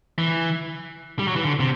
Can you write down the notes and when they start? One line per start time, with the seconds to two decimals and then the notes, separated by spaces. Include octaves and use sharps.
0.18 E3
1.19 G3
1.28 F#3
1.36 E3
1.44 D3
1.60 C3